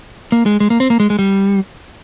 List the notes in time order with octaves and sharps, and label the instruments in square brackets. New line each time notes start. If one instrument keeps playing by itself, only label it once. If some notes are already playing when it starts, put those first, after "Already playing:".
[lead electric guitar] A#3
G#3
G#3
A#3
C4
A#3
G#3
G#3
G3